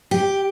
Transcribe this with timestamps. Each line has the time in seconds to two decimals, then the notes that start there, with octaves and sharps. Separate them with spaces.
0.11 G4